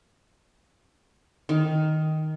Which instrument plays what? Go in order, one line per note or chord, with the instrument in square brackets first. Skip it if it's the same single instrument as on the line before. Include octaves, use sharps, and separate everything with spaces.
[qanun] D#3